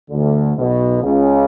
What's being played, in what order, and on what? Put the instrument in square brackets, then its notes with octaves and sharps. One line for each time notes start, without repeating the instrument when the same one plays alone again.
[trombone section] D2 D3
B1 B2
C#2 C#3